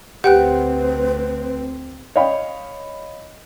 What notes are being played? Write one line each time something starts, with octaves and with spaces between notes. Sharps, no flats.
D2 C4 G4 B4 F#5 G5 F#6
C#5 D#5 F5 G5 B5